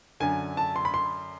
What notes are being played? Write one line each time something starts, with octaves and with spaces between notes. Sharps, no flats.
F#2 D3 G#5
A5
C6
B5
C6